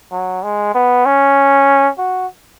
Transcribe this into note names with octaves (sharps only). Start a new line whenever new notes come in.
F#3
G#3
B3
C#4
F#4